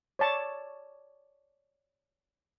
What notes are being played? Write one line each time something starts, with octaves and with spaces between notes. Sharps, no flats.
C#5 D5 A5 C#6